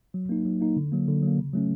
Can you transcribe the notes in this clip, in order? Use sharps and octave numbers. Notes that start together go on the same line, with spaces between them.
F#3
A#3 D#4
F#3
A#3 D#4
D3
F#3 A#3
D3
F#3
A#3
C#3
F#3 A3 C#4